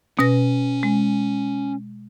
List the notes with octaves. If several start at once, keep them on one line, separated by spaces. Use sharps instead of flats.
B2 C#4 B4 A#6
G#3